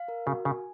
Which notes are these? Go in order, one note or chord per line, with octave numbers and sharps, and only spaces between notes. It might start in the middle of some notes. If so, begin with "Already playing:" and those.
Already playing: F5
A#4
C#3 F#4
C#3 G#5